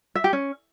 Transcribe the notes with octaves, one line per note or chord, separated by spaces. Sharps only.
E5
G4
C#4